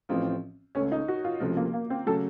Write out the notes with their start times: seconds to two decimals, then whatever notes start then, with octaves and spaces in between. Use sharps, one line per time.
0.09 A1 A2 F3 C4 F4
0.75 C#2 C#3 A3 C#4
0.92 D#4
1.08 F#4
1.25 F4
1.40 C#2 C3 F3 A3
1.57 A#3
1.74 A#3
1.90 C4
2.06 C#3 F#3 A3 A4